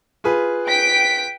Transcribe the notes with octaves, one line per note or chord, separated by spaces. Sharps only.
F4 G#4 B4
G5 B6 D7